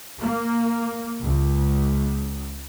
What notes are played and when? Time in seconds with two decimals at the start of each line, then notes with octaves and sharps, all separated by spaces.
0.22 A#3
1.25 C#2